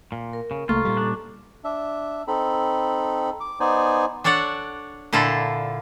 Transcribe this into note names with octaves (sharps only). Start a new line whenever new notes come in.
A#2
A#4
C#3
C2 A3 A#3 F4 A4 A#5 C#6
A#2 G3
D4
D4 E5
C4 D#4 A4 B5
D6
B3 D#4 C5 D5 G#5
D4 A4 C#5 D5 F#5
A#2 D3 E4 F4 A4